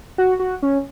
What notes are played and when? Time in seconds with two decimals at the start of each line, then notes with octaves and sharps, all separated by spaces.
0.18 F#4
0.40 F#4
0.63 C#4